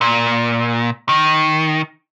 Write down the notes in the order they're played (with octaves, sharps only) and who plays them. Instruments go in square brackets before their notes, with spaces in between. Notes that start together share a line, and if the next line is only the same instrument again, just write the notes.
[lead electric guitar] A#2
D#3